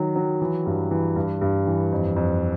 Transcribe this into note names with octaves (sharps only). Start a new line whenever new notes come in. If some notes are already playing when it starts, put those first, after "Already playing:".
Already playing: D#3 F#3
F#3
E3
G2
E3
G2
G2
E3
F2
F2